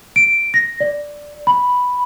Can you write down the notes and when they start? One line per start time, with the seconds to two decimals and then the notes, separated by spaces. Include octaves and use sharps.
0.16 D7
0.54 A#6
0.80 D5
1.47 B5